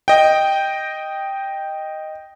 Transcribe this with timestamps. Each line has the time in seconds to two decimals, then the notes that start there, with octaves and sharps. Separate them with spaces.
0.08 D#5 G5